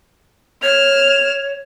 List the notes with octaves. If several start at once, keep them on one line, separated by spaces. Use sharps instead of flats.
C#5 F6 E7